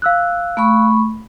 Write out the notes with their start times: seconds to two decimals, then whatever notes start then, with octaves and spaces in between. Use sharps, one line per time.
0.02 F5 E6 F#6
0.57 A3 B5 C#6